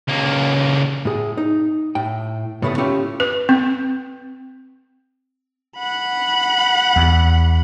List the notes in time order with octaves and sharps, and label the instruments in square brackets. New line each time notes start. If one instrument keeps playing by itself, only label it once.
[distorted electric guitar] C#2 A#3
[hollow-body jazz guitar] A2 G#4
D#4
A2 G5
A2 C#3 A3 B3
A3 C#4 E4 F4 G4 A4
[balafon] B4
C4
[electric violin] F#5 B5
[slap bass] E2